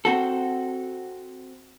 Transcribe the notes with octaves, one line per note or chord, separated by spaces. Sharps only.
C4 F#4 A4